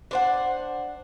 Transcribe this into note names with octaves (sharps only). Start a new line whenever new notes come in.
D4 C5 F#5